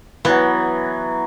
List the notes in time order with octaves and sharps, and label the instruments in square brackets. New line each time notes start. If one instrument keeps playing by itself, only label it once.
[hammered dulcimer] E3 F#3 [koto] B3